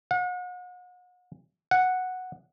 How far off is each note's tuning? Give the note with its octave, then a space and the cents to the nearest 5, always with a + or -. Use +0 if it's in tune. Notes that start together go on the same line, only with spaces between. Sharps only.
F#5 -40
F#5 -5